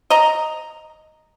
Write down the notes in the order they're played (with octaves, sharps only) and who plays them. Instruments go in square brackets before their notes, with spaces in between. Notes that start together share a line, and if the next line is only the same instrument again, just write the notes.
[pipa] D#5 A#5